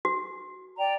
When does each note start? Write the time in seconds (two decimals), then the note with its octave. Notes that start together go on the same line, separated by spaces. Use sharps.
0.05 F#4
0.76 D5 G5 A#5